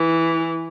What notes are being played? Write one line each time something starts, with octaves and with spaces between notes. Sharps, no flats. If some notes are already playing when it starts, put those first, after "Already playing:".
Already playing: E3